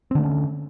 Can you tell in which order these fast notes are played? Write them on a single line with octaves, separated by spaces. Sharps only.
C4 D3 A3 C#4